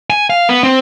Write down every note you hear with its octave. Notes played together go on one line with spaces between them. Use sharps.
G#5
F5
B3
C4